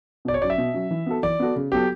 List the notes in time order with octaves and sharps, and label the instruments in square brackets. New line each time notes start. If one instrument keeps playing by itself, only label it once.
[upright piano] B2 [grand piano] D5
[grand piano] C#5
[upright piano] F#3 C#4 [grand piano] D5
[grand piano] E5
[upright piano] B2
F#3 C#4
E3
B3 F#4 A4
[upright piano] E3 [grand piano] D5
[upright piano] B3 F#4 A4
C#3
[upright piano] F#3 B3 F#4 A4 [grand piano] G4